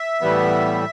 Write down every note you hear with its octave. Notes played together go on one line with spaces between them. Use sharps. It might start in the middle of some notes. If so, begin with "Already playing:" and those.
Already playing: E5
A2 E3 G3 B3